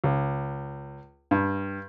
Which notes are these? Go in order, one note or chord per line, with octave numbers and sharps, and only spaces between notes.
C#2
G2